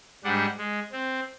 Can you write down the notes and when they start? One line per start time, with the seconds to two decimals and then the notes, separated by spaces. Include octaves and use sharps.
0.24 G#2 G3 D4 F#5
0.58 G#3
0.92 C4